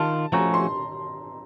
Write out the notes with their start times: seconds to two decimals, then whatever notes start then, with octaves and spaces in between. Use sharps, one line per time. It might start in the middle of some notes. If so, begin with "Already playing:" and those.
Already playing: D#3 F4 A5
0.32 F3 A3 C#4 F#4 A#5
0.54 C6